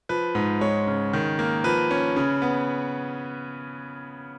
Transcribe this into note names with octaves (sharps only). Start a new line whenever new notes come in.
F3 B4
G#2
G#3 C#5
C#3
D#3
A#3
F3 B4
C#4
C#3
B3